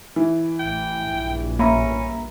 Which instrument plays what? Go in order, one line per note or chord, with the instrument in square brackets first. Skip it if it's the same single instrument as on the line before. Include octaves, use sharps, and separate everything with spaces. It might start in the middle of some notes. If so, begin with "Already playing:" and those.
[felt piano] E3
[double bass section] A1 [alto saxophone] G5
[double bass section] A#1 G2
[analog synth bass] A#3 [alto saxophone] C#4 [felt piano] E5 A#5 B5